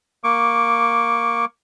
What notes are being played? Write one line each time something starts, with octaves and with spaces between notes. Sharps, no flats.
A#3 C#6 D6